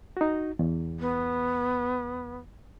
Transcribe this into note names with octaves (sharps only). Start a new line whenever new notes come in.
D#4 F#4
E2
B3